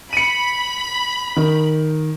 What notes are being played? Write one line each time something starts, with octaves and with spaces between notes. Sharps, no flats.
B5 C#7 D#7
D#3